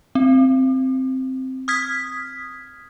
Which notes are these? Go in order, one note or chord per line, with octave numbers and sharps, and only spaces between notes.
C4
D#6 F6 G#6 B6